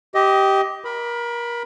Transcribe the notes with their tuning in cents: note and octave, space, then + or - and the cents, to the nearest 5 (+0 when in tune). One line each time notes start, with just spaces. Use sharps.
G4 -10 D#5 +20
A#4 +30 B5 +0